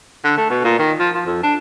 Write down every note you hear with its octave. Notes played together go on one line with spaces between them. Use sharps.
D3
A3
B2
A#2
D#3
F3
F3
F2
D4